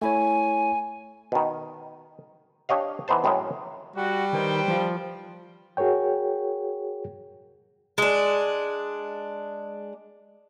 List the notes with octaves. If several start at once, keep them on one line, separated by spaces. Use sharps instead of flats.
A3 E4 C#5 G#5
B2 D#3
D4 G4 C#5 D#5 F5
E3 B3 D#4 C5 A5
F#2 A2 G#3 G#4 A#4
G3 F#4
D#3 B4 C5 G5
F3
F#4 G#4 A#4 C#5 G5
G#3 D4